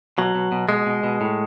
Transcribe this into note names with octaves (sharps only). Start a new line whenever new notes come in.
B2 F#3
B2
B2
B2 G#3
B2
B2
A2